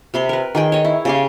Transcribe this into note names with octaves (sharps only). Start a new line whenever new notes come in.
C3 B5 C6
A#4 B4
D#3 G#4 G5
C#5 D#5
E4
C#3 G4 F5